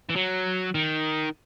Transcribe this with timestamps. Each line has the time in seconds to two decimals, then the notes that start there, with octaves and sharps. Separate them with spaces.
0.09 E3
0.15 F#3
0.75 D#3